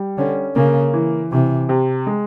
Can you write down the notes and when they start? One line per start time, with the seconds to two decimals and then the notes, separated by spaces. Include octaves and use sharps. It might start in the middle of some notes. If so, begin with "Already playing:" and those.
Already playing: G3
0.18 D3 C#4
0.56 C#3 A#3
0.93 E3
1.31 C3 E3
1.69 C3
2.07 G#3